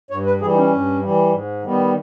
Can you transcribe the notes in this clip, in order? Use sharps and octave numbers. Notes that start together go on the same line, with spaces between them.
G2 C#5
B4
E3 G3 G#4
D#4
C#4
G2
E3 G3
G#2
D#3 G3 B3